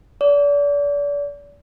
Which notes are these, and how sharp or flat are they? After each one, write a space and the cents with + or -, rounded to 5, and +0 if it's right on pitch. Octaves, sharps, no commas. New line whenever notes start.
D5 -35